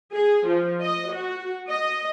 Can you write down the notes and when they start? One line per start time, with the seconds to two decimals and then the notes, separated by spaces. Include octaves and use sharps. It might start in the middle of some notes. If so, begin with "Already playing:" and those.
0.13 G#4
0.47 F3
0.82 D#5
1.12 F#4
1.70 D#5